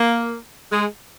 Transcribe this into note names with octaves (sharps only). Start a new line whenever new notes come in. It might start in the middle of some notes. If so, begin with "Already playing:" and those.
Already playing: A#3
G#3